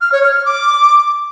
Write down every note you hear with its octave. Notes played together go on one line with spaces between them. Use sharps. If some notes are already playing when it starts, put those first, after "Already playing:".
F6
C#5
F6
F6
D6